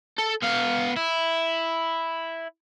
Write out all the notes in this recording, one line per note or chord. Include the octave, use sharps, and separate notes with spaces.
A4
B3 F5
E4